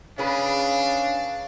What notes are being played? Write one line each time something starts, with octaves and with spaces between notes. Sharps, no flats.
C#3 C#4 D4 G#4 B4 F5